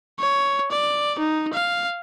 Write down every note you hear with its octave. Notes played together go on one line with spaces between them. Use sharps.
C#5
D5
D#4
F5